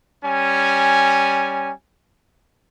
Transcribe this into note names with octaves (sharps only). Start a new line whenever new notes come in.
G3 C#4 G#5